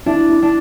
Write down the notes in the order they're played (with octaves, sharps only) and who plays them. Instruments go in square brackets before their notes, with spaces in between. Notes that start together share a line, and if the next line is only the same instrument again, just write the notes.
[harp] D4 [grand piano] E4
[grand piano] E4
[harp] D4